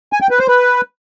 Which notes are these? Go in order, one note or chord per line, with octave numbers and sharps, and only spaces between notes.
G#5
G5
B4
C5
B4